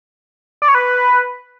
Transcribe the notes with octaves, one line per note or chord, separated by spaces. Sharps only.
D5
C#5
B4